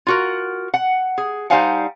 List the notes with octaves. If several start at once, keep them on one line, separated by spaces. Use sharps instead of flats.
F4 F#4 A#4
F#5
G#4
G3 D#4 C5 F5 F#5 G#5